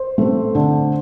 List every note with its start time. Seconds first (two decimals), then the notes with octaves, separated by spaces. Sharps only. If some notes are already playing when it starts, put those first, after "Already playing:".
Already playing: C5
0.18 A3 C4
0.55 D3